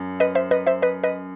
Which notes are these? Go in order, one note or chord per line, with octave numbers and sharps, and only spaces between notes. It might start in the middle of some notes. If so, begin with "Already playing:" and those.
Already playing: F#2
B4 D#5
C5 E5
B4 D#5
C5 E5
B4 D#5
B4 D#5